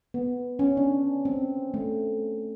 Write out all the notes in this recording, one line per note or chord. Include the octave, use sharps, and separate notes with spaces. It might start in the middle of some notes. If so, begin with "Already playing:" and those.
B3
C#4
D4
C4
A3